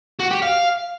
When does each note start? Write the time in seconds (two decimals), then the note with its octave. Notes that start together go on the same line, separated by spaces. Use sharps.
0.20 F#4
0.31 G4
0.42 F5